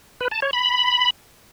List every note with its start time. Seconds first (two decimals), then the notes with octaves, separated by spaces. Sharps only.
0.21 B4
0.31 A5
0.42 C#5
0.53 B5